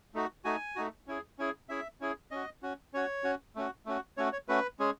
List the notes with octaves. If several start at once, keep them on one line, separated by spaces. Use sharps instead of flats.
A3 D#4 F#4
A3 D#4 F#4 G#5
A3 D#4 F#4
C#4 E4 G#4
C#4 E4 G#4
C#4 E4 G#4 E5
C#4 E4 G#4
C#4 F#4 D#5
C#4 F#4
C#4 F#4 C#5
C#4 F#4
A3 C#4 F#4
A3 C#4 F#4
A3 C#4 F#4 C#5
C#5
A3 C#4 F#4 B4
G#3 C#4 G#4